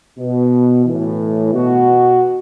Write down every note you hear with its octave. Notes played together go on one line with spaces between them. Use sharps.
B2
A2 E3
B2 F#4